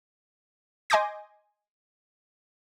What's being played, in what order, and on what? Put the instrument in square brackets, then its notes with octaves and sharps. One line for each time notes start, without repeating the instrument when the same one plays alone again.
[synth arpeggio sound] D#5 G#5 C6 D6 G6 A#6